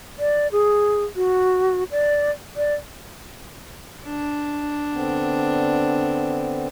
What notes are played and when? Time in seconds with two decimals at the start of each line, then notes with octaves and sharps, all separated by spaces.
0.19 D5
0.52 G#4
1.16 F#4
1.91 D5
2.57 D5
4.06 D4
4.93 D3 B3 C4